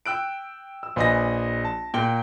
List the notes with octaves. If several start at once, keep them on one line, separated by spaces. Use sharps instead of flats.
G5 E6 F#6 D7
E6
A#1 B4 D#5 G#5 A#6
A5
A#2 G5 G7